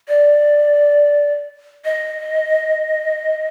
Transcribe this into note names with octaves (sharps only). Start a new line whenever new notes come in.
D5
D#5